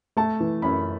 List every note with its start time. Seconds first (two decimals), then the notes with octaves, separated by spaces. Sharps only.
0.17 A3 A5
0.40 E3
0.62 F#2 B5